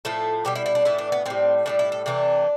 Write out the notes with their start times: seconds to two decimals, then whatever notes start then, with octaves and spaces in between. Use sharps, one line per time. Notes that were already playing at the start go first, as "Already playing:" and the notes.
0.05 A2 F3 A3 A4
0.45 B2 G3 G4
0.56 E4
0.66 E4
0.75 D4
0.85 A2 E3 A3 E4
0.98 D4
1.12 B3
1.26 A2 G3 C4
1.66 A2 E3 G3 D4
1.79 E4
1.92 A4
2.06 C3 E3 A3 D4